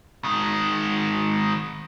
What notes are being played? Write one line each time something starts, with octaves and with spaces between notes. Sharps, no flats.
D#3 G#3